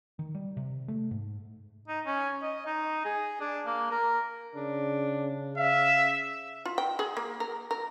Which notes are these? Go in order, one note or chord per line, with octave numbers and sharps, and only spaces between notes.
D#3
G3
C3
A3
G#2
D#4
C#4
D#5
D#4
G#4
D4
A#3
A#4
C#3 D4
E5 F5
F4
G5
G#4
A#3
A#4
A#4